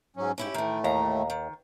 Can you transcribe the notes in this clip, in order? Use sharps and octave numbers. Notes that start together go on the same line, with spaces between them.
G#2 F#3 C#4
G#2 C#4 E4 G4
A2 D#3 E3 A3
D#2 A#2 E3 A#5
D#3